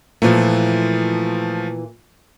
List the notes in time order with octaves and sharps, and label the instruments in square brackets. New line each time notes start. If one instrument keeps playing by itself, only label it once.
[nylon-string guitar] A#2 E3 [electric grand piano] F3 A3